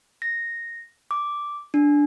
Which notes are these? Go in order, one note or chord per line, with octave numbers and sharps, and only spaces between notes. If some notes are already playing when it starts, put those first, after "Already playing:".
A#6
D6
D4